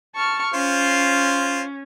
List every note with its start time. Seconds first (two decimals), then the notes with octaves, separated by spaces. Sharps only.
0.14 A5 C#6 F6
0.54 C#4 F4 C5